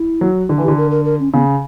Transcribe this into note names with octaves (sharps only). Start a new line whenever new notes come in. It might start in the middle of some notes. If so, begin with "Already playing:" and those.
Already playing: E4
F#3
D3
E3
G4
D3
A#4
A#4
A#4
C#4
C#3 B3